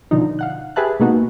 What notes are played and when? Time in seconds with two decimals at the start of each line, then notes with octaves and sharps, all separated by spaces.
0.11 B2 D3 F3 D#4
0.39 F5 F#5 F#6
0.76 G4 G#4 B4 E5 A5 F#6
1.00 B2 G#3 A#3 B3 D#4 F#4